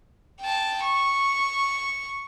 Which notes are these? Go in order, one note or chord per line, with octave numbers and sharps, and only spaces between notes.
G5 A5
C#6